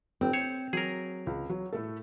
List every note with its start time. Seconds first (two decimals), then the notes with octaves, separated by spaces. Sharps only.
0.21 G1 C4
0.33 C5 C#5
0.73 F#3 G#4 A#4
1.27 C#2
1.49 F#3
1.73 A2 A3 A4